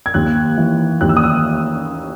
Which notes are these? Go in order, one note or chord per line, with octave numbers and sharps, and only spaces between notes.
G#6
D#2 F#6
E3
D#2 F#6
E6
D#6
E6